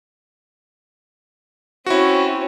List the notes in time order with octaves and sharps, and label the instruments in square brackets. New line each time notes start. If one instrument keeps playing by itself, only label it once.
[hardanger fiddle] C4 C#4 [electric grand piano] E4 F#4